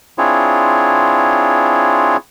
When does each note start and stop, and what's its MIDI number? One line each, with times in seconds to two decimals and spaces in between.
0.18 2.17 60
0.18 2.17 62
0.18 2.17 64
0.18 2.17 65
0.18 2.17 68
0.18 2.17 73